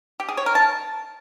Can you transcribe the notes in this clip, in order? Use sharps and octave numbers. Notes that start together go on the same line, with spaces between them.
G4
G#4
C#5
A#4
A5